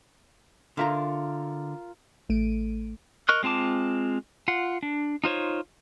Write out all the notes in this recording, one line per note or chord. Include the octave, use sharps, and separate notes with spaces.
D3 F4 A#4 E5 A#5
A1 A3 D7 D#7
A#4 D#5 C#6 F6 F#6
G#3 C4 F4 A5 D6
F4 F#5
D4
D#4 F4 C5 C#5